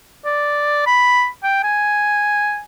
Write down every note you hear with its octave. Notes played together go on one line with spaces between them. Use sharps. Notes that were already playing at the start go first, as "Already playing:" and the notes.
D5
B5
G5
G#5